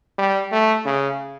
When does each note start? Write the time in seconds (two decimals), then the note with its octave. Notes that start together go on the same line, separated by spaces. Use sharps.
0.18 G3
0.52 A3
0.85 C#3